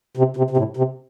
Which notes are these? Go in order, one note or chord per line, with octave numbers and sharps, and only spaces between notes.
C3
C3
C3
A2
C3